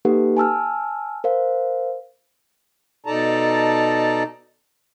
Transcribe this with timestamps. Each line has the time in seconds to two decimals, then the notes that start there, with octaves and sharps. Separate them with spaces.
0.05 A#3 D#4 G4 A4 B4 F#5
0.37 G#5 A5 E6 F6
1.24 A#4 C5 F5
3.06 B2 D#4 A4 D5 A5 A#5